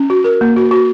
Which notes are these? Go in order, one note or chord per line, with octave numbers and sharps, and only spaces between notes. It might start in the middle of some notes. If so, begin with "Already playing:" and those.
Already playing: C#4
F#4
A#4
A#3
F#4
F#4